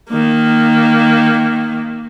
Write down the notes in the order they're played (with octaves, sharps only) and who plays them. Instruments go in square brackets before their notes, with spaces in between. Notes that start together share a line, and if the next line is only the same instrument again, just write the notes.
[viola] D#3 A#3